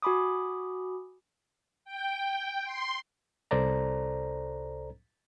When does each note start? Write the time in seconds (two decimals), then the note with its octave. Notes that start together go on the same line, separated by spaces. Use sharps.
0.02 F#4 G#5 B5 D6 D#6
1.85 G5
2.22 G5
2.64 C6
3.51 C2 A4 C5 D5 A#5